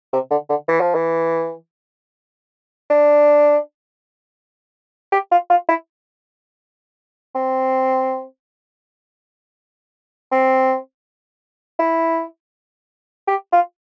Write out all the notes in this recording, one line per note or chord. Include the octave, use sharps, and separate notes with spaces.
C3
D3
D3
E3
F3
E3
D4
G4
F4
F4
E4
C4
C4
E4
G4
F4